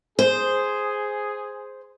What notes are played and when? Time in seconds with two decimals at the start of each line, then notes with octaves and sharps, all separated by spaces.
0.19 G#4 C5